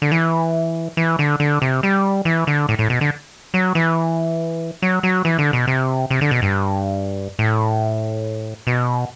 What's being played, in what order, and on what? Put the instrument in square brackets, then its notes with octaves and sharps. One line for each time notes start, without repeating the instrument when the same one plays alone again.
[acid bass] D3
E3
E3
D3
D3
C3
G3
E3
D3
A2
A2
B2
D3
F#3
E3
F#3
F#3
E3
D3
B2
C3
C3
D3
B2
G2
A2
B2